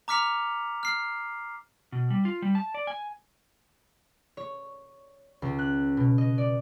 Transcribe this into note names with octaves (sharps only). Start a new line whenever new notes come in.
A#5 D6 F6 B6 C#7 F7
F6 C7
B2
G3
F4
G3
A5
D5
G#5
C#5
C#2
F#6
B2
D#5
D5